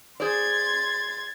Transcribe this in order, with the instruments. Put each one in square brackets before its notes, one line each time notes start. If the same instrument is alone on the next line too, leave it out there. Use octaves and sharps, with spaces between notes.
[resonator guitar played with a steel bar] G#4 C5 D5 [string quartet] C6 G#6 A6